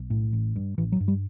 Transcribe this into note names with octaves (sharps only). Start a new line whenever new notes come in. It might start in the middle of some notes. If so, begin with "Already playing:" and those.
Already playing: B1
A2
A1
G2
A1 E3
F#3
G2
G3